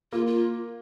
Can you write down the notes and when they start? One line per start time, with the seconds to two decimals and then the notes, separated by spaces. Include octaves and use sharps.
0.12 A#3 F4
0.27 F4